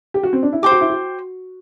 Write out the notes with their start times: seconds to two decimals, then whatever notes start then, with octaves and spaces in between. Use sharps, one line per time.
0.14 G4
0.23 F#4
0.33 C4
0.43 D4
0.53 E4
0.62 G4 C5 G5 D6
0.72 F#4
0.81 E4
0.90 F#4